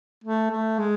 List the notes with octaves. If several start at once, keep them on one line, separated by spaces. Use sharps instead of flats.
A3
A3
G#3